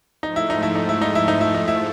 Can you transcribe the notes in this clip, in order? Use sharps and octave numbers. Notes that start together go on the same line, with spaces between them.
G#2 F3 A3 D#4
E4
D#4
E4
D#4
E4
D#4
E4
D#4
E4
D#4
E4